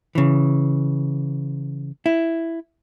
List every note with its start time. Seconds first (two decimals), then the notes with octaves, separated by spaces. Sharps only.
0.15 C#3 E3
2.06 E4